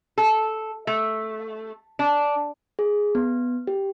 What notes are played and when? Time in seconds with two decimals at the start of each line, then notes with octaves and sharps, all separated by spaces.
0.18 A4
0.87 A3
1.99 D4
2.79 G#4
3.15 B3
3.67 G4